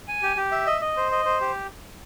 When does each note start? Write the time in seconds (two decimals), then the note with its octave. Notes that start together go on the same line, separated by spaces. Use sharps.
0.08 G#5
0.23 G4
0.37 G4
0.52 E5
0.67 D#5
0.81 D#5
0.97 C5
1.12 D#5
1.25 C5
1.41 G4